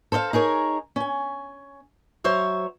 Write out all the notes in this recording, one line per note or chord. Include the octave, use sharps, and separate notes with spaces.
A4 C5 D#5 F5
D#4 G#4 A#4 C#5
C#4 G#5
F#3 C5 C#5 E5